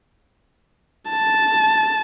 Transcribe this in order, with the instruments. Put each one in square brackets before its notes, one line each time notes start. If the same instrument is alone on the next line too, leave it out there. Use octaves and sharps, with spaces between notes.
[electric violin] A5